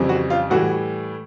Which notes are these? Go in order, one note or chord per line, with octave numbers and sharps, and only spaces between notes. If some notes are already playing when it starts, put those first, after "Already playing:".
Already playing: F2 C#3 E3 G3 C4
F#4
F4
A2 E3 G3 F#4